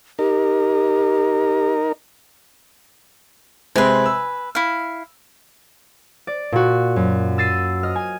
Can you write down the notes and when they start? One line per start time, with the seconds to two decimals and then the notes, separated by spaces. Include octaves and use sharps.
0.19 D#4 G4 A#4
3.76 C3 G#3 C4 B4 G#5
4.05 E6
4.55 E4 F5
6.27 D5
6.52 A#2 F#4
6.96 F#2
7.38 E6 A6 C7 D#7
7.83 D#5 F6
7.96 G#5